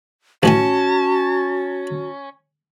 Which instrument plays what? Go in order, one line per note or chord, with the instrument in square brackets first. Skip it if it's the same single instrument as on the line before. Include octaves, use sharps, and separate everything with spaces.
[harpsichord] A1 E3 G#5 [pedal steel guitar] C#4 [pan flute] F#4 [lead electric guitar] A5